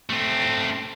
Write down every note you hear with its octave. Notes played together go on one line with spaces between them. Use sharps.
A3 C4